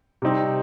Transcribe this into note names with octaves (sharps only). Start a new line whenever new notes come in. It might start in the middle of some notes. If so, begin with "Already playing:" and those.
C3 G3 C4 D#4